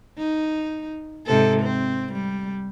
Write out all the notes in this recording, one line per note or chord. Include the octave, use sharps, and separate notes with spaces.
D#4
G#2 C3 A4
C4
G3